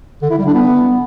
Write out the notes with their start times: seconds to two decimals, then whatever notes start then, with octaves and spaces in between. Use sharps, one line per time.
0.22 D3
0.30 E4
0.38 G3
0.46 D4
0.54 B3